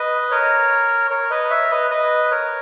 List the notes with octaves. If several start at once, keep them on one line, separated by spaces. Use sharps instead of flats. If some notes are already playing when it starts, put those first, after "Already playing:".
Already playing: B4 D#5
A#4 C#5
A#4 C#5
B4 D#5
C#5 E5
B4 D#5
B4 D#5
A#4 C#5